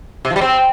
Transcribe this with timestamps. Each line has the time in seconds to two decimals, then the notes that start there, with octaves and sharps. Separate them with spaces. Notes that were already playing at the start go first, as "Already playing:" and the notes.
0.25 C3
0.30 F3
0.36 G3
0.41 C4